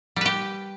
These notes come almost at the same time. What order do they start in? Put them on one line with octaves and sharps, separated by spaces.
G3 B4 G4